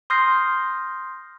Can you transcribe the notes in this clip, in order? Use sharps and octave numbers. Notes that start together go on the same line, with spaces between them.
C6 D#6 F6 G6 A#6 C7